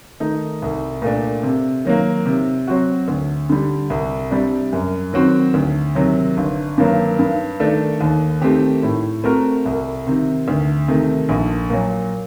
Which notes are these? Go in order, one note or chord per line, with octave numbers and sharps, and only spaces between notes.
D#3 A3 D#4
C2
A#2 A3 D4
C3
D#3 F#3 A#3
C3
F#3 C4 F#4
D2
D3 G3
C2
C3 G3 D4
F#2
D#3 F#3 C4 F#4
D2
C3 D#3 F#3
G1
G2 D#3 F#3 A#3
G2
D#3 A3 D4 A4
D#2
D#3 A3 C4 G4
A2
A3 C4 F#4 A#4
C2
C3 D#3
D2
C3 D#3 A3
A#1
A#2 F#3